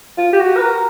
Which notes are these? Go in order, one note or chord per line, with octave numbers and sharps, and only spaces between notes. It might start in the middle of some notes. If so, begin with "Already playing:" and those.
F4
G4
F#4
B4
A#4